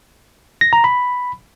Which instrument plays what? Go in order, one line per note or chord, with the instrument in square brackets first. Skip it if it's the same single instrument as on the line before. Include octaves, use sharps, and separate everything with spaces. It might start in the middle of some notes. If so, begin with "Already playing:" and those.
[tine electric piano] A#6
A#5
B5